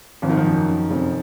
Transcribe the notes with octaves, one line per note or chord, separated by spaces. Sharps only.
G#1 F3
D#3
F3
F#2
F#2
F1